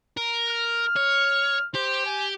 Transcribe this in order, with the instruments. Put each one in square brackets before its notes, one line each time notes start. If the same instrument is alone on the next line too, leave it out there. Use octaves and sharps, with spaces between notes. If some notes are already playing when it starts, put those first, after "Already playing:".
[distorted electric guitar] A#4
[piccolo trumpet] F6
[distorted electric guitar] C#5
[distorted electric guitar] G4 [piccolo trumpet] C5
[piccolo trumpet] G#5